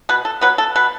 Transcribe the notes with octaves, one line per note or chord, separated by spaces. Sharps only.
B2 B4
A4
F#3 B3 B4
A4
B2 B4